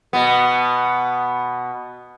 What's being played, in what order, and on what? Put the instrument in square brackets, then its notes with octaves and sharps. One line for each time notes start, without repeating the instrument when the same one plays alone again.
[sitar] B2 B3